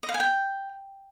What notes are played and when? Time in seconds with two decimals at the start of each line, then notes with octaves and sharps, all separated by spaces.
0.03 D#5
0.09 F5
0.14 G#5
0.20 G5